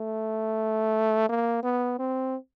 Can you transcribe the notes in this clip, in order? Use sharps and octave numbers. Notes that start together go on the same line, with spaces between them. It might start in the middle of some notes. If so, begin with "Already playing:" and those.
Already playing: A3
A#3
B3
C4